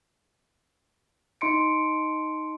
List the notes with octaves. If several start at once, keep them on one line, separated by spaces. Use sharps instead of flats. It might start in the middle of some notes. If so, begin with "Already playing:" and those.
D#4 D#5 C6 C#7 D7